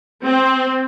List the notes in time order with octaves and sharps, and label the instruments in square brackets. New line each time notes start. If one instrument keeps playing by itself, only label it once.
[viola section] C4